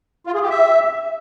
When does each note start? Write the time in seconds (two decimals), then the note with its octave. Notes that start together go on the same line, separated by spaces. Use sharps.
0.27 F4
0.34 G#4
0.42 G4
0.50 E5